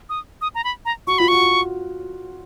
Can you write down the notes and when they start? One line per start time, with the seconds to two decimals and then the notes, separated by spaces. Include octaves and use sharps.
0.09 D#6
0.41 D#6
0.55 A#5
0.64 B5
0.85 A#5
1.07 F#4 C#6
1.18 F4 B5
1.28 F#4 C#6